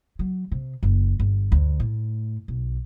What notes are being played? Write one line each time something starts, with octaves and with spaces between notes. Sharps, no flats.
F#3
C3
F#1
G1
D2
A2
B1